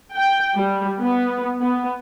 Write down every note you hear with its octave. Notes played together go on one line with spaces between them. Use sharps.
G5
G3
B3
B3